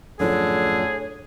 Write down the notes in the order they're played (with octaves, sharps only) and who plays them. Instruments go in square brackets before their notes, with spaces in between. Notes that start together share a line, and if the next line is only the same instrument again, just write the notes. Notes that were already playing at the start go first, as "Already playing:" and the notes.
[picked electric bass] F#2 A2 F3 [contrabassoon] D3 [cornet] G#4 [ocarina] C#5